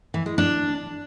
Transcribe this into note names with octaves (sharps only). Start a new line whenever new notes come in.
E3
G#3
D4